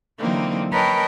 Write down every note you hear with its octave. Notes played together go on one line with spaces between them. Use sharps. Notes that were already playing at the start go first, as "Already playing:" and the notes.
D3 E3 F#3 A#3 C4 D#4
A#4 B4 C#5 D#5 G5 A5